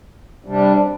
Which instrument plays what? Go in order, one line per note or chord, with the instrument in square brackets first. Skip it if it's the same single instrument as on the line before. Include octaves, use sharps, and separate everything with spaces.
[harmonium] C3 G3 D4